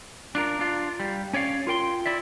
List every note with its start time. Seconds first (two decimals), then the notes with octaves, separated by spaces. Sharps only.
0.35 D4 F4 A#4
0.59 D4 F4
1.00 G3
1.33 C#4 C#5 D5 F5
1.67 F4 A#4 G5 C6
2.06 E4 D5 E5